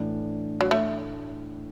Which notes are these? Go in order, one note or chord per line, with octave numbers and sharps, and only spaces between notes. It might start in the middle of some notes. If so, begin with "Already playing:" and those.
Already playing: A2 E3 D4
F#3
A3